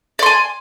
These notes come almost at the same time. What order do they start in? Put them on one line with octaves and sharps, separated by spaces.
D5 C6 G#5